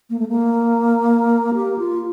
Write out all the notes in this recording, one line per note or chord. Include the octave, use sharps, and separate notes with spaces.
A#3
A3
A#3
G4
F4